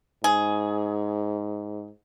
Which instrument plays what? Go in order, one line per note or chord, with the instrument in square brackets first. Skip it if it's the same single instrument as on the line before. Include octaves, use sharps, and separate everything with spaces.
[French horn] G#2 [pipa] G#4